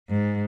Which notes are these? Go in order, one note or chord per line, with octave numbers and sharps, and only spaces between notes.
G#2